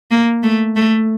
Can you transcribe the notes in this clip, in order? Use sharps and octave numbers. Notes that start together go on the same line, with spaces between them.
A#3
A3
A3